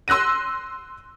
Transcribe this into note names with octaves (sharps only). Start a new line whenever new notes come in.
C6 E6 F#6 A#6 D#7